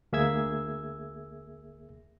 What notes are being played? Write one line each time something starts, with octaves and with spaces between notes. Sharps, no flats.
D2 A#3 G#4 E5 E6 G#6